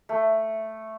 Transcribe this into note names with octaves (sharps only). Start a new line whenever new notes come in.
A3